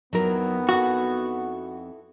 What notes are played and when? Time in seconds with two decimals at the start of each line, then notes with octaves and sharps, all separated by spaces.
0.13 F2 F#3 B3 D#4 E4 A#4
0.69 E4 F#4 A4